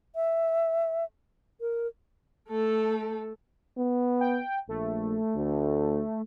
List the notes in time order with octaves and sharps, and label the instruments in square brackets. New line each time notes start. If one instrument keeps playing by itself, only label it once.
[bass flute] E5
A#4
[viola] A3 A4
[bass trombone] B3
[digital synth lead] G5
[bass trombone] A#1 [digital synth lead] A3
[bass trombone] D2